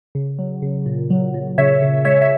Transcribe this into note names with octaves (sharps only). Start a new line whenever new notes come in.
C#3
F#3
C#3
A#2
F#3
A#2
C#3 C#5 E5
C#3
G#3 C#5 E5
E5